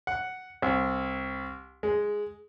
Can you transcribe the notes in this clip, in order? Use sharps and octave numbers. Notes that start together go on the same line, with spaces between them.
F#5
C2
G#3